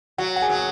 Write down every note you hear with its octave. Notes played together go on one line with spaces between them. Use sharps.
F#3 F#4 F#5
F#5
G#4 G#5
F#3
G#5